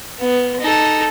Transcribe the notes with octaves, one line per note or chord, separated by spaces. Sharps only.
B3
D#4 A4